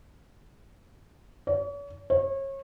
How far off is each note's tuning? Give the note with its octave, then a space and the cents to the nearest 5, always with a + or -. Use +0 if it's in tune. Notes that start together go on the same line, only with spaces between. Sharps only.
C#5 +45
C#5 -30